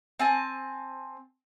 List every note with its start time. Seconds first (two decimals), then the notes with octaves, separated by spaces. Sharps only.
0.19 C4 G#5 A5